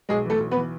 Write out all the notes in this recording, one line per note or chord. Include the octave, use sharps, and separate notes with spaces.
B1 G#3 G#4
E3 A3 A4
B1
B3 B4
E3